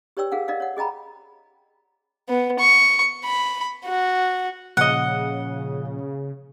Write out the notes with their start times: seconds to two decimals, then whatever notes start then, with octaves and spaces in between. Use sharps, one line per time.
0.17 G4 B4 C#5 D5 G5 E6
0.32 G#4 A#4 F5 F#5
0.48 A#4 D5 D#5 F5
0.60 C#5 F#5
0.77 G#4 D#5 G5 A#5 B5
2.29 B3
2.59 C#6
3.25 B5
3.86 F#4
4.77 A#2 C#3 F3 D#5 F#5